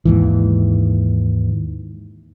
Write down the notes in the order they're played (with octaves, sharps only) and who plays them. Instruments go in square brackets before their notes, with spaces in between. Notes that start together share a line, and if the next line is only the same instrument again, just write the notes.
[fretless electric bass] D#2 G#2 E3